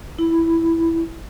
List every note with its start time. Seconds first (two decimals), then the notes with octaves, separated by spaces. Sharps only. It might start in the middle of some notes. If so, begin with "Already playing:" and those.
0.19 E4